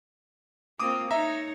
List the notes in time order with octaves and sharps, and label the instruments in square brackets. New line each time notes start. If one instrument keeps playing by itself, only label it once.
[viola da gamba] A#3 C4 F4 [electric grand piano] D6 D#6
[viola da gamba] D#4 C#5 [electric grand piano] D#5 E5 A#5